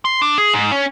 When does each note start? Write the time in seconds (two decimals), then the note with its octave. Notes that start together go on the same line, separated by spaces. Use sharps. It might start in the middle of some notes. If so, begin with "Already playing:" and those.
0.05 C6
0.22 D4
0.38 G#4
0.54 G#2
0.72 C#4